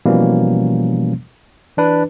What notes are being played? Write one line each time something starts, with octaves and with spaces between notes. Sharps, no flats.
B2 E3 F3 G3 A#3 C#4
E3 D4 B4